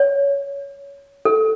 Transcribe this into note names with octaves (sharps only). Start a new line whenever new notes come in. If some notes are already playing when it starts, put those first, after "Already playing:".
Already playing: C#5
A4